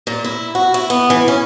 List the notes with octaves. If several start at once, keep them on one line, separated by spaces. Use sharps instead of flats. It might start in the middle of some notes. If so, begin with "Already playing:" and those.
A#2
E4
F#4
E4
B3
E3
C#4